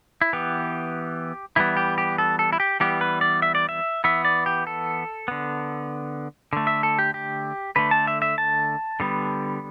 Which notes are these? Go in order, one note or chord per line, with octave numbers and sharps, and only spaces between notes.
E4
E3 B3 G4
E3 G3 B3 E4
G4
G4
A4
A4
E4
G4
E3 G3 B3 G4
B4
D5
E5
D5
E5
E3 B3 E5
D5
G4
A4
D3 B3
D3 A3
E5
A4
G4
G4
D3 A3 B4
A5
E5
E5
A5
D3 G3 B3